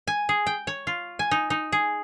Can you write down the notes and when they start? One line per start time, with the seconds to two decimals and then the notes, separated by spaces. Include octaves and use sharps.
0.08 G#5
0.29 G#4
0.47 G5
0.67 C#5
0.87 F4
1.19 G#5
1.31 D#4
1.50 D#4
1.72 G#4